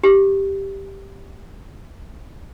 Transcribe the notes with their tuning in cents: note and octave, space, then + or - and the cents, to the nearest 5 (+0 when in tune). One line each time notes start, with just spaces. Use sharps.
G4 +0